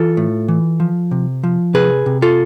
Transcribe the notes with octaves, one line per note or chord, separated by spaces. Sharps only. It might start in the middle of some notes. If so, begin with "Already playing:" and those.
Already playing: E3 F4 A4
A2
E3
F3
C3
F3
C3 G#4 B4
C3
F4 A4